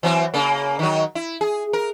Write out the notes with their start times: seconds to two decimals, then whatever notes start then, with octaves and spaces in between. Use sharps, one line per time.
0.03 E3 F#3 C4
0.34 C#3 A#3
0.79 D#3 F#3
1.15 E4
1.41 G#4
1.73 A#4